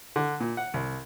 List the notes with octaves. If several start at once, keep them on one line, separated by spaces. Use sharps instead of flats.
D3
A#2
F#5
C2